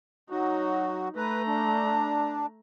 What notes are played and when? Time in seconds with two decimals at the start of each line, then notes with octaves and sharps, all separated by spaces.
0.30 F#3 D#4 F#4
1.16 A3 B4 A#5
1.47 D4